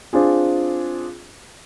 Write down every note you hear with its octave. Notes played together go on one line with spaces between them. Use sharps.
C4 D4 F4 G#4